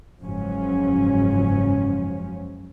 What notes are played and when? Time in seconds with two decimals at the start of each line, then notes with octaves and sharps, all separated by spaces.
0.20 F#1 G#2 F3 F#3 C#4